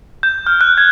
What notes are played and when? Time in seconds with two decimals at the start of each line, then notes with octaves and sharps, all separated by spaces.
0.23 G6
0.46 F6
0.61 F#6
0.78 G#6